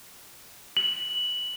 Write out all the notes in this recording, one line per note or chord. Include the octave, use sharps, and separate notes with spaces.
F#7